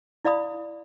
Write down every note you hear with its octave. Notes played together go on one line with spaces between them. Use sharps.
E4 D5 F5 B5 D#6